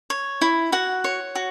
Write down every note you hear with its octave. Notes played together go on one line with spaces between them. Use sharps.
C#5
E4
F#4 F#5
C#5
F#4